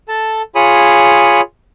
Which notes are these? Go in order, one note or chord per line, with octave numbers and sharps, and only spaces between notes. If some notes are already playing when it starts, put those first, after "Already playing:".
A4 A5
F4 G#4 C#5 B5 D#6